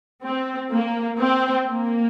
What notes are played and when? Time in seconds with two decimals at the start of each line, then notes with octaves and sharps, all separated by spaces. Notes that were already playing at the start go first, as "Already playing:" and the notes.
0.23 C4
0.71 A#3
1.19 C4
1.67 A#3